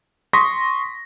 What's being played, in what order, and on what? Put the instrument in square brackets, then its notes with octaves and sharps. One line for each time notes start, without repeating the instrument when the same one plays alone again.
[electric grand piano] C6 C#6 D#6 A#6 B6